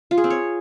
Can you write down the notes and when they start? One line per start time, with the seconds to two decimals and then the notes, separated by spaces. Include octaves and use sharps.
0.11 F4
0.17 G#4
0.24 C4
0.30 C#5